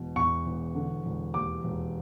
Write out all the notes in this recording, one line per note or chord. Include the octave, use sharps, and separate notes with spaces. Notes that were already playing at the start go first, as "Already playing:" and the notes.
Already playing: E1 B2
E2 C#6
E1
D3
E1
D#2 D6
E1